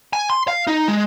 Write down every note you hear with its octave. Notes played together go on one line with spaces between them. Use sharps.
G#5
C6
F5
D#4
G#3